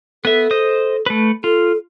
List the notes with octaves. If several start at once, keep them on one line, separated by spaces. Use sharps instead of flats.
B3 A4 E5
C5 D#5 D#6
A3 B4
F4 A4